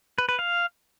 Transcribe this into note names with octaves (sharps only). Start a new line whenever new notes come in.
B4
B4
F5